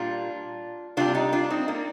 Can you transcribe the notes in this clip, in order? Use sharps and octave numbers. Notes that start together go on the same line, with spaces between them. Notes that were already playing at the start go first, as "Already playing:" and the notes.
Already playing: A#2 G3 D4 F4
C3 G3 D4 F4
D#4 G4
D4 F4
C4 D#4
A#3 D4